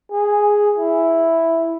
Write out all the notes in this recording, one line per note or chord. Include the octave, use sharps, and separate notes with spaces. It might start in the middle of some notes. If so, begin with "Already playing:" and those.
G#4
E4